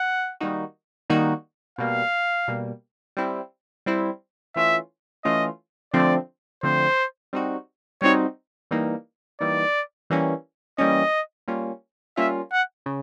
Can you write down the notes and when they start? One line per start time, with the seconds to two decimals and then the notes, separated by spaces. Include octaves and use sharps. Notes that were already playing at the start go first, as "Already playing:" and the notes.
Already playing: F#5
0.40 D#3 G3 A#3 D#4 F#4
1.10 D#3 G3 A#3 D#4 F#4
1.78 B2 G3 A#3 F5
2.48 B2 G3 A#3
3.17 G3 C4 E4
3.86 G3 C4 E4
4.56 E3 A3 C#4 F4 E5
5.25 E3 A3 C#4 F4 D#5
5.94 D3 F3 A3 C4 D5
6.63 D3 F3 A3 C4 C5
7.33 G3 C4 D#4 F#4
8.02 G3 C4 D#4 F#4 C#5
8.71 E3 G3 A#3 D#4
9.40 E3 G3 A#3 D#4 D5
10.10 E3 G3 A#3 C#4
10.78 E3 G3 A#3 C#4 D#5
11.48 G3 A#3 C#4 F4
12.17 G3 A#3 C#4 F4 E5
12.52 F#5
12.86 C#3